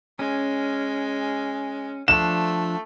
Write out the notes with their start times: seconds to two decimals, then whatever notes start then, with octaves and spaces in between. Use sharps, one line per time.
0.19 G#3 C#4
2.08 F3 A3 D4 F#5 E7